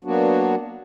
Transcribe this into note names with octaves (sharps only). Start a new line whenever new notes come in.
F#3 A#3 B3 D4 F#4